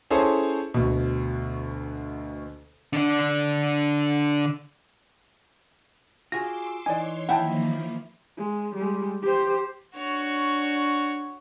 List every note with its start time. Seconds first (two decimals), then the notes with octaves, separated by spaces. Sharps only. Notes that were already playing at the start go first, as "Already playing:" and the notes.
0.11 C#4 E4 G#4 A4 C5 C#5
0.74 D2 B2
2.93 D3 D4
6.32 F4 F#4 G#4 C6 D6 E6 A#6
6.86 E3 D#4 C#5 D5 G#5 C6
7.29 D#3 F3 A#3 E4 F#5 G5 A5
8.38 G#3
8.75 G3 G#3
9.22 G4 C5
9.96 D4 F#4 C#5